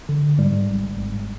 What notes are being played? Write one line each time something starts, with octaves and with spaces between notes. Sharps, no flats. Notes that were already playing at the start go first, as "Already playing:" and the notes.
D3
G#2 G3
G#1
G#1